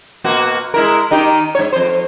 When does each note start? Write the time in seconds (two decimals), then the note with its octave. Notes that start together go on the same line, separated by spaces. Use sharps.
0.24 B2 A#3 F#4
0.74 G#3 E4 A#4
1.11 D#3 D#4 G4
1.55 G#2 C#5
1.73 F2 C5